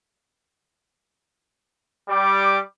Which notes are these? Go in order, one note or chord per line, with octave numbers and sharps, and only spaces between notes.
G3 D6